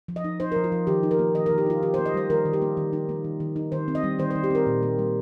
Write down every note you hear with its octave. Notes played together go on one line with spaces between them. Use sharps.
F3
D#5
D#4
D#4 C5
A#4
F3
F4
F3
D#3 G4
D#4
A#4
A#3
D#3 D#5
A#4
D#3
G4
D#4 F4
D#3 G4
C5
A#3
D#5
G3 C5
D#3 A#4
D#3
G4
A#3
D#3
D#4
A#3
D#3
D#3
D#4
D#3 C5
C4
D#5
G3
D#3 C5
C5
D#3
G4
C4 A#4
A#2
A#3
G3